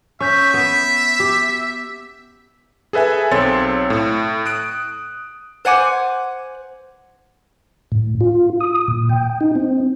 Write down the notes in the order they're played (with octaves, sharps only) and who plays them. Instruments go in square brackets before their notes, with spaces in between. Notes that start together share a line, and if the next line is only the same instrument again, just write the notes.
[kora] C#4 [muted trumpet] E5 [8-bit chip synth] C#6 G6 B6
[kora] B3 [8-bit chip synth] B6
[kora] G4
[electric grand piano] G#4 A4 B4 E5 G#5
B1 C4 A4 C#5 C6 A6
A2
D#6 F#6 D7
[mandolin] C5 F#5 G#5 D6
[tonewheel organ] A2
F4
D#6
A#2
G5
D#4
C4